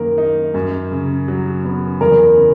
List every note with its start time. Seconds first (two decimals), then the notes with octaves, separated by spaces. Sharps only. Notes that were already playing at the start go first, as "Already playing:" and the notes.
Already playing: F#2 D#3 A#3 A#4
0.18 D#4
0.54 F#2
0.91 C#3
1.28 F#3
1.65 B3
2.01 E2 A#4
2.38 C#3